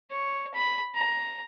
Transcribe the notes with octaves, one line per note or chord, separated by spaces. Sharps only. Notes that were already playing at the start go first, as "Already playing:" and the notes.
C#5
B5
A#5